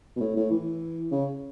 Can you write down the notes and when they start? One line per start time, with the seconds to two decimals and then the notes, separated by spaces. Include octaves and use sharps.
0.16 B2
0.21 A2
0.36 A2
0.51 E3
1.11 C#3